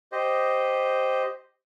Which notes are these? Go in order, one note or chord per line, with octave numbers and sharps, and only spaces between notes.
G4 C5 D#5